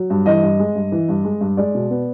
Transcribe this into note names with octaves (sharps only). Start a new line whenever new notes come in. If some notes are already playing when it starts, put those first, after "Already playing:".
Already playing: F#3
G2
E3 D#5
G2
G#3
G2
E3
G2
G#3
G2
G#3 D5
B2
B3